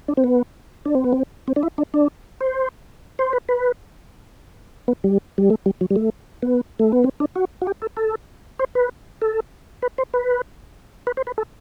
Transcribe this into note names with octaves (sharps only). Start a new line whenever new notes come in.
D4
C4
B3
D4
C4
B3
C4
C4
D4
E4
D4
D4
C5
C5
B4
B4
B3
G3
G3
A3
G3
F#3
G3
A3
B3
A3
B3
C4
D4
F#4
F#4
G4
A4
A4
C5
B4
A4
B4
C5
B4
B4
C5
B4
A4